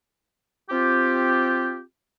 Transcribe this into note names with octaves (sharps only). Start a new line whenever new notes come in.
C4 F4 G4